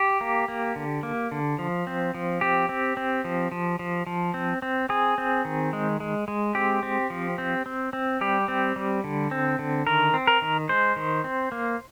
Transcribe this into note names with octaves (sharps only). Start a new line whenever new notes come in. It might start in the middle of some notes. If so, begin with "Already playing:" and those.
Already playing: G4
A#3
A#3
D3
A#3
D3
F3
C4
F3
C4 G4
C4
C4
F3
F3
F3
F3
C4
C4
C4 G#4
C4
D#3
G#3
G#3
G#3
C4 G4
C4
F3
C4
C4
C4
G3 G4
C4
G3
D3
C4
D3
D#3 A#4
C4
A#4
D#3
G#3 C5
D#3
C4
A#3